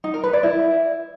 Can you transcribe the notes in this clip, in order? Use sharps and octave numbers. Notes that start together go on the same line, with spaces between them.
D#4
A#4
B4
D5
E4